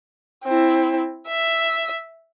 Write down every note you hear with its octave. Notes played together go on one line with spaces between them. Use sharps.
C4 E4
E5